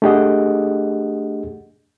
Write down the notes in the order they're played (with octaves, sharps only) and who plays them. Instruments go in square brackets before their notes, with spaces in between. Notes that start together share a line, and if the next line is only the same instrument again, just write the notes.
[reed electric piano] A3 D4 G4 G#4 D#5 F#5